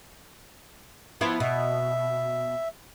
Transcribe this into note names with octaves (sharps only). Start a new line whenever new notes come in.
F3 B3 E4 F4
B2 E5